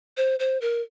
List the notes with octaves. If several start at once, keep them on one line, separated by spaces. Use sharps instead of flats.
C5
C5
A#4